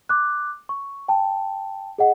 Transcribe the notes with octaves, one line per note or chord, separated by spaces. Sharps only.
D6 F#6
C#6
G5 A5
G#4 D#5 F#5